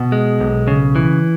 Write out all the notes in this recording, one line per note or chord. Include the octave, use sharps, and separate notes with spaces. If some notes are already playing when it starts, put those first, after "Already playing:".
Already playing: B2
G#3
B1
C#3
E3